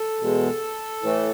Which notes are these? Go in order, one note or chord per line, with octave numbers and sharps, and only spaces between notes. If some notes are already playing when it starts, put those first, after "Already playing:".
Already playing: A4
E2 B2 G#3
A2 E3 A3